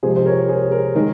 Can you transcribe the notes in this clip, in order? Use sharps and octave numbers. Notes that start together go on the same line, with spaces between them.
C3 F3 G#3 G#4 C5
C5
A#4 C#5
G#4 C5
A#4
D#3 G#3 A#4